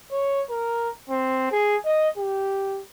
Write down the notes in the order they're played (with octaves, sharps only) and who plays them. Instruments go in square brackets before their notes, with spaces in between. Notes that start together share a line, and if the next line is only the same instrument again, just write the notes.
[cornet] C#5
A#4
C4
G#4
D#5
G4